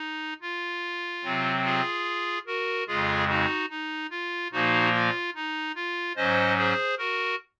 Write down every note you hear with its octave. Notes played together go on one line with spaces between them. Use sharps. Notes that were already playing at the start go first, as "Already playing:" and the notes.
Already playing: D#4
F4
C3 F#3 C4
F4 G#4
F#4 A#4
F2 C#3 G#3 F4 G#4
D#4 F#4
D#4
F4
A#2 F3 A#3 D#4 F#4
F4
D#4
F4
G#2 F#3 C#4 C5 D#5
G#4 C5
F#4 A#4